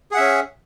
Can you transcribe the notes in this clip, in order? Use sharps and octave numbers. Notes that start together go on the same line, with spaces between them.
C#4 G#4 E5 F#5